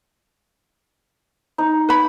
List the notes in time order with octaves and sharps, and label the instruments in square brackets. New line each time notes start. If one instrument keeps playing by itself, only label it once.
[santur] D#4
[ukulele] B4 B5